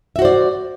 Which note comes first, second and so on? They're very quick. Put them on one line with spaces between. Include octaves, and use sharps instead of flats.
E5 F#4 C5 D5